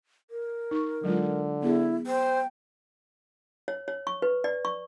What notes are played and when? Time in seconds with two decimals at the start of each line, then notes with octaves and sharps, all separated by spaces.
0.30 A#4
0.71 D#4 C#6
1.04 D3 F#3 G#3 F4
1.62 B3 E4 G#4
2.07 C5 G5
3.68 C#5
3.88 C#5
4.07 C#6
4.22 B4
4.44 D5
4.65 C#6